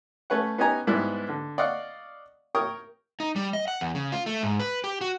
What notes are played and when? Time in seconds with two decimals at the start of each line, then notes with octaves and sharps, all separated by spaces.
0.30 A3 C#4 B4 C#5 F#5
0.58 B3 C#4 D#4 G4 G#5 A#5
0.87 G#2 G3 B3 E4 B4
1.29 D3
1.58 D5 D#5 F5 F#5 C#6
2.55 A#4 C#5 G5 C#6 D#6
3.20 D#4
3.36 G3
3.53 D#5
3.68 F#5
3.81 E2
3.95 C#3
4.12 F4
4.26 A3
4.43 G#2
4.59 B4
4.84 G4
5.01 F#4